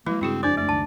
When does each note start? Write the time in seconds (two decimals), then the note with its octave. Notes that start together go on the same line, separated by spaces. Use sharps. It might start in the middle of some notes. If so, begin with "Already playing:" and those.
0.06 F3 F#3 G#3 A#3 E4 B4
0.21 G2 C#3 C4 E4 F#4 G#4
0.43 F#1 F2 D4 C5 D5 D#6
0.57 A3 D5
0.69 C#2 F#2 D#3 A5